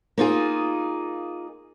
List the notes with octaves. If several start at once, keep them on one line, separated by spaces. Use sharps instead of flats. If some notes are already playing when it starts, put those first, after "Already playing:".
A#3 D#4 F4 G#4